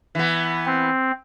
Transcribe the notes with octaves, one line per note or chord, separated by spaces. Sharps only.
E3 B3
C4